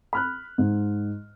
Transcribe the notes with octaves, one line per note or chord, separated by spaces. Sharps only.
B5 F6 F#6
G#2